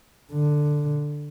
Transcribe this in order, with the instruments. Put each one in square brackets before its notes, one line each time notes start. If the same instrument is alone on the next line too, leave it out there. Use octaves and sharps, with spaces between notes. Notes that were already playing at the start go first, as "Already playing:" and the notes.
[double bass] D3